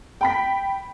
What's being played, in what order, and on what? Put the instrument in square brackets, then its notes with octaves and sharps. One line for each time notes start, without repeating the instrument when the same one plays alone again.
[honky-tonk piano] G5 B5 B6